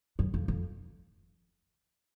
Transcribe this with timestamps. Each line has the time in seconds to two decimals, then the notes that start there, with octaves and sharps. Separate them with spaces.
0.19 F#2
0.34 F2
0.48 F2